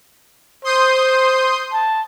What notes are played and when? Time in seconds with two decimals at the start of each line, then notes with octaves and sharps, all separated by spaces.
0.64 C5 C6 D#6 G6
1.73 A5